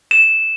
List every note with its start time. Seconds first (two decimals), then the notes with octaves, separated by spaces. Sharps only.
0.11 E7